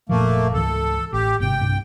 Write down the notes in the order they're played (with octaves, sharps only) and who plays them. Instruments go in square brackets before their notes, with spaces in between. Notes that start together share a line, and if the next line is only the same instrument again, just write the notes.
[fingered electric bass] F1 A#2 F3 [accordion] A3 A#3
[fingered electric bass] C#2 G#2 E3 [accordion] A4
[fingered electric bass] A1 [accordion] G4
[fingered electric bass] G1 G#2 C3 [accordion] G5
[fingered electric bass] B1 G2 C3